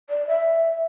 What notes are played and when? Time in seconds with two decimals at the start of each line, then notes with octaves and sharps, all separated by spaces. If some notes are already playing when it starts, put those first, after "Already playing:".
0.10 D5
0.27 E5